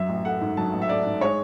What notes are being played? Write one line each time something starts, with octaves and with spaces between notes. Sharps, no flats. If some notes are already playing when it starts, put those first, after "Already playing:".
Already playing: F#2 F#3 E5
A1
A3 F#5
G#2
F#3 A5
A1
E5
A3 D5
G#2
G#3 C#5